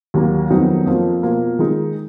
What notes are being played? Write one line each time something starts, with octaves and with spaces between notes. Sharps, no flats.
D#2 D#3 F#3 A#3
F2 D#3 F#3 B3 D#4
F2 F3 A#3 F4
B2 A#3 F4
D#3 G#3 D#4